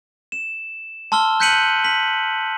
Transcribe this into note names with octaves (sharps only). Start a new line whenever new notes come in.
E7
A5 C6 E6 F6 G7
F#6 G6 B6 C#7 D#7 F#7
B6 F#7